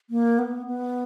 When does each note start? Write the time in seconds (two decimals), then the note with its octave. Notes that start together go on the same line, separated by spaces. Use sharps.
0.10 A#3
0.38 B3
0.66 B3